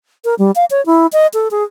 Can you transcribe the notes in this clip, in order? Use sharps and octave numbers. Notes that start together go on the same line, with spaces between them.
A#4
G3
F5
C#5
E4
D#5
A4
G#4